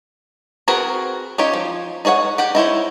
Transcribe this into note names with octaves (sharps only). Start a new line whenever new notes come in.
C4 F#4 G#4 A#4 B4
C#4 D#4 F4 G4 C#5
F3
D#4 G#4 C#5 F5 F#5
G4 F#5 G5
D#4 E4 C5 C#5